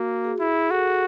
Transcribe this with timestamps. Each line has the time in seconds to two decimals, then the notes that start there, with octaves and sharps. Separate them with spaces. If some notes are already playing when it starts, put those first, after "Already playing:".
Already playing: A#3 F#4
0.25 G#4
0.39 E4 G#4
0.70 F#4 A4